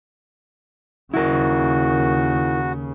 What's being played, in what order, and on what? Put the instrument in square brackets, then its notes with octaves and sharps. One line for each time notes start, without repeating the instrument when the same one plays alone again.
[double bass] D#2 C#3 [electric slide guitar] E4 A#4 [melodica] F#4